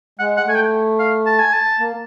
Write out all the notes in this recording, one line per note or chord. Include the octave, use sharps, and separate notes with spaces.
G#3 F#5
F#5
A3 G#5
G5
F5
A5
G#5
A5
A#3